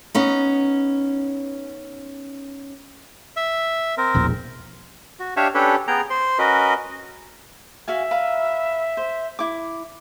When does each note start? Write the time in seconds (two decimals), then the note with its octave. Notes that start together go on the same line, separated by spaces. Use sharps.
0.15 B3 C#4 D#4
3.36 E5
3.98 C4 A#4
4.15 E1 A#1 E2
5.20 F#4
5.37 D4 G4 C#5 E5 F5 C#6
5.54 C#4 D4 G4 A4 B4 C#5
5.88 B3 G#4 G5 A#5
6.10 C5 C6
6.39 C#4 F#4 A#4 B4 D#5
7.88 F#4 E5 F5 G#5
8.11 B4 F5 A#5
8.97 C5
9.39 E4 D6